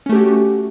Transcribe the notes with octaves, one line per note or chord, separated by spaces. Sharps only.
A3 C#4 F#4 G4